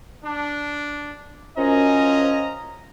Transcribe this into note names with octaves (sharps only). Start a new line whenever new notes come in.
D4
F#2 F3 C#4 D#5 A#5